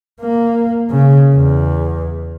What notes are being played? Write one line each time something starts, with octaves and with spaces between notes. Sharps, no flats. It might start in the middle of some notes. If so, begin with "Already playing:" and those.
A#3
C#3
E2